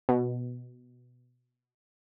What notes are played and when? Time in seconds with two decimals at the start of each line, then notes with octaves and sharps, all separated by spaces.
0.09 B2